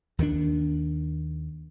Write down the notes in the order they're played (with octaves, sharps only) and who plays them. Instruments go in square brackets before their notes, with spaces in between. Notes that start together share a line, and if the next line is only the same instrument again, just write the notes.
[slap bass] D#2 D#3 F#3 D4